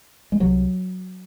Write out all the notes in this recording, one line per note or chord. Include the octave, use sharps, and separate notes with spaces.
G#3
C2 C3 F#3